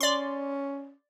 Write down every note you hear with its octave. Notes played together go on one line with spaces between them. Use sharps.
C#4 D5 C6